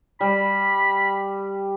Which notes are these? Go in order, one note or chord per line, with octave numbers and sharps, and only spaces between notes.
G3 B5